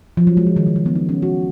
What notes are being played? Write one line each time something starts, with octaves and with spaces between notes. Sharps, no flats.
F3
F#3
G#3
F3
D#3
C#3
D#3
B3
D#4
C#4
F#4